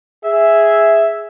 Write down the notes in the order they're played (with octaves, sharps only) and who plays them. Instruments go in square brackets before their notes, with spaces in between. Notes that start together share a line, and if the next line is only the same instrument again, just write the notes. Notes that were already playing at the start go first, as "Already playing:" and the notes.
[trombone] G#4 [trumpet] E5